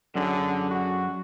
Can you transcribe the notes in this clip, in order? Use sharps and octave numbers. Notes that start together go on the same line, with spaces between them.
F#2 D3 F#3 G#4
F#4